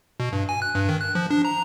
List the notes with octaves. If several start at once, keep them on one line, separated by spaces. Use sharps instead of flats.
B2
G2
G#5
F#6
G2
D#3
F#6
F3
D4
A#5